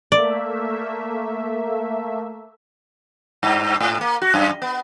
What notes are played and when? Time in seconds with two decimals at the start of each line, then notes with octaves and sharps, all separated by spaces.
0.12 A3 A#3 D5 E5
3.43 G2
3.80 G#2
4.01 A#3
4.22 F#4
4.34 F#2
4.62 B3